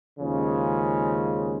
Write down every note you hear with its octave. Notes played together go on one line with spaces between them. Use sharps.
D#2 C#3 F3 G#3 C#4